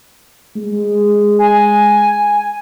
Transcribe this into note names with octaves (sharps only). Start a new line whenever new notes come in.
G#3
G#5